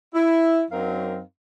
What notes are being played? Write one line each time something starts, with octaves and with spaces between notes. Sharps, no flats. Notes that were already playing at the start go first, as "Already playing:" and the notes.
E4
F#2 F#3 C4 D#4 A#4 F5